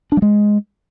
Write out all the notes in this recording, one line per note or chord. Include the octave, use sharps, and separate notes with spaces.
D4
G3
G#3